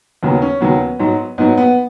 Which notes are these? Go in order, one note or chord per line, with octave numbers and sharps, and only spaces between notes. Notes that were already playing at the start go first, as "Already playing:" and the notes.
D#2 C#3 F#3 B3
C#4
D#2 C#3 F#3 B3
G#2 F#3
G#2 F#3 B3
B3